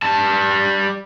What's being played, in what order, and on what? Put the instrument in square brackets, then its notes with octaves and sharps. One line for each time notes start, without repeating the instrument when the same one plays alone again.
[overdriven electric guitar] G3 A5